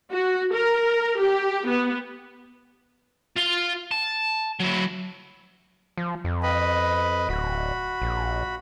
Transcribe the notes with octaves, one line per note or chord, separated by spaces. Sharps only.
F#4
A#4
G4
B3
F4 F5
A5
F#3 E4
F3
F2
B4 D#5 B5
D1 F#4 B5
A#1